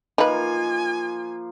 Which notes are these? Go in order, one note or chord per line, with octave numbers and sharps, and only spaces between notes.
F3 A#3 D#4 F4 B4 D#5 F5 G#5